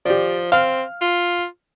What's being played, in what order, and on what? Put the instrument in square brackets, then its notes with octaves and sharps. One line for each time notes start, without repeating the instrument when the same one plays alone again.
[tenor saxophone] F3 [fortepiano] G4 D5
[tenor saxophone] C4 [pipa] F5 [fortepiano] F6
[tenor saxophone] F4